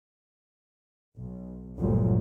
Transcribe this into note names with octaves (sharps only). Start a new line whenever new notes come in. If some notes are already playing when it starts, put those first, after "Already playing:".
B1
G1 D2 G2 A#2 F3 F#3